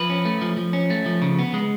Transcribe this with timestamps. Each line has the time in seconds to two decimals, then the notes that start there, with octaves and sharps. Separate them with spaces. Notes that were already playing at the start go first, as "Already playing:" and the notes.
Already playing: F3 B4
0.10 C#4
0.25 A3
0.41 F3
0.57 F3
0.73 C#4
0.90 A3
1.06 F3
1.22 C#3
1.39 B3
1.54 G#3